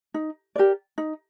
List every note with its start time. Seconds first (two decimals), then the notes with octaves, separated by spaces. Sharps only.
0.14 D#4
0.55 G4 A#4 D5
0.98 D#4